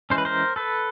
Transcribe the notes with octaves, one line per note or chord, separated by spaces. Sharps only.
E3 G#3 C#4 C5
B4
A#4 C5
A4 B4